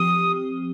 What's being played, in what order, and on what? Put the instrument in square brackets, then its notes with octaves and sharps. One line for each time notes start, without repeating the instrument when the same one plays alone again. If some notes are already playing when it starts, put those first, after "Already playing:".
Already playing: [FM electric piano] F3 C4 G4 [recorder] D#6